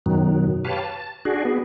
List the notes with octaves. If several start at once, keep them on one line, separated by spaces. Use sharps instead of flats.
F#2 B2 D#3 F#3
G4 B4 C#5 F5 A5
A5
D4 F#4 G#4
B3